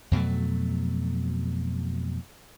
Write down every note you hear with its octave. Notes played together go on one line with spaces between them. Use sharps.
F2 B2 F#3 A3